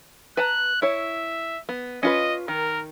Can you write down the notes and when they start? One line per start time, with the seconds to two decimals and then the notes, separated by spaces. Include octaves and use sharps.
0.37 B4 A5 A#5 F#6
0.82 E4 C#5 E5
1.69 B3
2.03 C#4 F4 B4 D#5
2.48 D#3 A#4